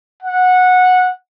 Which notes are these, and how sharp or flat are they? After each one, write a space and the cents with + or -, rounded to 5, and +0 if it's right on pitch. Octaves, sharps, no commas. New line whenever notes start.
F#5 -15